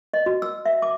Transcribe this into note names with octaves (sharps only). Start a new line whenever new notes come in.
D#5
F#4
E6
E5
D6